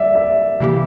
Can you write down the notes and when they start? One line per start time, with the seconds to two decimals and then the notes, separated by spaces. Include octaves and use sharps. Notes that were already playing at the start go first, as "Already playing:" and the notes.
Already playing: G3 D5 E5
0.15 E5
0.60 C3 E3 A#3 E4 G4